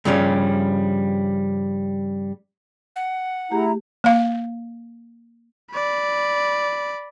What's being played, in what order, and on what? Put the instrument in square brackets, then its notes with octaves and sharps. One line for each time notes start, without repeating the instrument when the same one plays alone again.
[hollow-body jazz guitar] G2 C#3 F3 G3 C#4
[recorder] F#5
[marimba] A3 G4 G#4 [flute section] E4 A#5
[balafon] A#3 F5
[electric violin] D5 B5